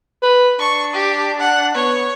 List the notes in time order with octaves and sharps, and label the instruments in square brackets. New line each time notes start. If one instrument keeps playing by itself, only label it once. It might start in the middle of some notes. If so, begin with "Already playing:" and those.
[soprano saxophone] B4
[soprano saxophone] D4 [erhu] C#6
[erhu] G4
F#5
[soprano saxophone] B3 [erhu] C#5